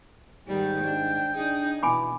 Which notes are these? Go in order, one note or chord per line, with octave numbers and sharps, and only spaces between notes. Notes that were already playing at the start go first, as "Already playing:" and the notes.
G#2 D#3 G3 G5
D4
D4 D#4 G#4
B2 E3 G#5 B5 D6